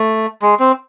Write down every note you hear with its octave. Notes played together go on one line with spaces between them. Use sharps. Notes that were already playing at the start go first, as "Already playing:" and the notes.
Already playing: A3
G#3
C4